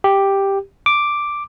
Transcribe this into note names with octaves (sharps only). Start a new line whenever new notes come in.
G4
D6